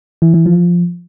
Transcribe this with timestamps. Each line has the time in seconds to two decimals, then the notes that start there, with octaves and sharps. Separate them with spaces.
0.22 E3
0.34 E3
0.46 F3